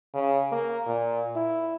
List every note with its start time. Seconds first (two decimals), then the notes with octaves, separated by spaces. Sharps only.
0.14 C#3
0.52 A#3
0.86 A#2
1.36 E4